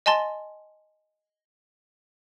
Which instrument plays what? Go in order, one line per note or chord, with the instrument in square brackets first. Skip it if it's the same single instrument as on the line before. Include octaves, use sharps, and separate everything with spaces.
[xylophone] D#5 G#5 A5 C6 A6